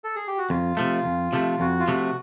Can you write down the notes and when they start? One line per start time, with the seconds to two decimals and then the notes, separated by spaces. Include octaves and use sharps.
0.04 A4
0.15 G#4
0.27 G4
0.38 F#4
0.50 F2 F4
0.77 C3 F3 A3
1.05 F2
1.33 C3 F3 A3
1.60 F2 F#4
1.80 F4
1.88 C3 F3 A3 F#4